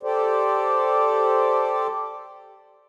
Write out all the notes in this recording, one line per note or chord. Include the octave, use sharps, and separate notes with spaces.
G4 A4 C5 D5